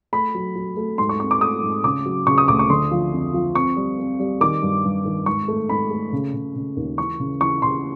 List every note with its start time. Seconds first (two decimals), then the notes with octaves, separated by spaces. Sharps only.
0.13 A3 B5
0.35 F#3
0.55 F#3
0.77 A3
0.98 G#2 C6
1.09 C#6
1.20 C4 C#6
1.31 D6
1.41 A3 D#6
1.63 G#2
1.84 C#3 D6
2.06 F#3
2.27 C#3 C#6
2.38 D#6
2.48 D2 D6
2.59 C#6
2.70 D3 C6
2.91 F3
3.12 F2
3.34 F3
3.55 C4 C#6
3.76 G3
3.98 C4
4.19 G3
4.41 D#3 D6
4.63 G2
4.84 G2
5.05 D#3
5.26 G#2 C#6
5.48 A3
5.69 G#2 B5
5.91 A3
6.12 C#3
6.34 C#3
6.56 C#3
6.77 D#2
6.98 E3 C#6
7.19 C#3
7.41 E3 C#6
7.62 C#3 C6